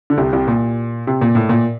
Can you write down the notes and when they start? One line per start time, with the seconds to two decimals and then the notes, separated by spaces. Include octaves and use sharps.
0.10 D3
0.18 C2 C3
0.33 C2 C3
0.47 A#2
1.07 C3
1.21 A#2
1.35 A2
1.49 A#2